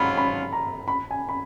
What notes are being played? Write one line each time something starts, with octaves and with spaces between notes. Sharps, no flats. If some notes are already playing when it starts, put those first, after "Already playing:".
Already playing: G#2 F#3 C#4 F4 B5
B5
A#5
B5
G#5
B5